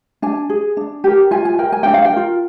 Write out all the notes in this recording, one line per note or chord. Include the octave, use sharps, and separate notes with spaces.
D4 G#5
G#4
D4
G4 A#4
F4 G#5
G#5
A#4 G5
G#5
D4 G5
F5
G5
F4 A#4